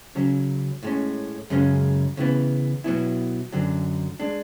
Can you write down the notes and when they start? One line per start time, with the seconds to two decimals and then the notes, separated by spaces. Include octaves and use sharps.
0.15 C#3 F#3 C#4
0.83 A2 G#3 C#4
1.50 F#2 C#3 G#3 C#4
2.17 C#3 E3 B3
2.84 B2 F#3 B3 E4
3.53 F#2 D3 F#3
4.20 G#3 D4